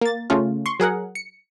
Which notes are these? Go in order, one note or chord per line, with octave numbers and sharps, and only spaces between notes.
A#3 A6
C#3 A3 C#4 F4
C6 C#6
F#3 G#4 A#4 F#5
C#7